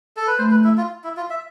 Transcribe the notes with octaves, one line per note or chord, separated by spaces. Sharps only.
A4
B4
A3 C5
B4
E4
F4
E4
F4
E5